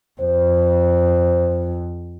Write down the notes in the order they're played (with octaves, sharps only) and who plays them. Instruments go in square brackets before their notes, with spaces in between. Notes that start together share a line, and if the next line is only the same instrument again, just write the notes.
[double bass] F2 [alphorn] C5